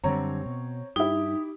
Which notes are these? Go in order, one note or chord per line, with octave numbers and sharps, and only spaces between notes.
F#2 D3 G3 C4 C#5 A#5
B2
G2 D#4 E4 G4